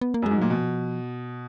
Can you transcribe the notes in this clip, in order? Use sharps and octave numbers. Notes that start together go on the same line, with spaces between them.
B3
A#3
F#2 G#3
G#2
A#2 F#3
B2 F3